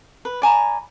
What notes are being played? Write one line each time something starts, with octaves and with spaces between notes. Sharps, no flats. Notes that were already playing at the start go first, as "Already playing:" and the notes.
B4
D5 G#5 A#5 B5